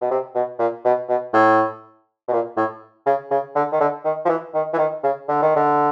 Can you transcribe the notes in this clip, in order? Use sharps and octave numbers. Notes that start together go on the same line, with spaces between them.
B2
C3
B2
A#2
B2
B2
A2
B2
A#2
A2
C#3
C#3
D3
D#3
D3
D#3
F3
E3
D#3
E3
D#3
C#3
D3
D#3
D3